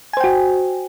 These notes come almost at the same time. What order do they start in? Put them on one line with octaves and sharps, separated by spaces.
G#5 C5 G5 F#4